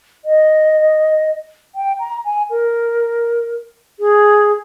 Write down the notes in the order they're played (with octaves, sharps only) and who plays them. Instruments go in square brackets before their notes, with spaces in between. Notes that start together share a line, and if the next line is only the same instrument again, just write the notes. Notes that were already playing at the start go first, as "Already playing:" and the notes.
[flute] D#5
G5
A#5
G#5
A#4
G#4